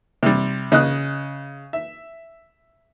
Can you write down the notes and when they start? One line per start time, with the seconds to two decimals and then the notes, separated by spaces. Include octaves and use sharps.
0.23 C3 G3
0.72 C#3 D#5 D#6 F#6
1.73 E5